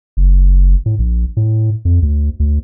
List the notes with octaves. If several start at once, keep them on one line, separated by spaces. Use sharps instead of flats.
F#1
A2
A#1
A2
F2
D2
D2